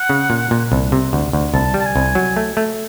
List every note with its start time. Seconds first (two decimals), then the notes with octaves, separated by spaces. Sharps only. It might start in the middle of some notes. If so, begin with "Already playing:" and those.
Already playing: F#5
0.09 C#3
0.30 A#2
0.51 A#2
0.72 C2
0.92 C3
1.13 D2
1.33 D2
1.54 C2 A5
1.74 G3
1.81 A5
1.86 G#5
1.96 C2
2.15 F#3
2.36 A3
2.57 A3